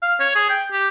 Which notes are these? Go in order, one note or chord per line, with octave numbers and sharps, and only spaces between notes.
F5
C#5
G#4
G5
G4